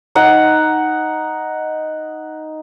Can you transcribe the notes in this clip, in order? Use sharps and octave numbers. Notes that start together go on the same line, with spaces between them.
D#4 F#5